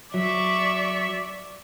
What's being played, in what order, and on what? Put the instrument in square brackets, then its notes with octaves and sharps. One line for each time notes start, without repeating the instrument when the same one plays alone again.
[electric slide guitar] F#3 [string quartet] D5 E5 C#6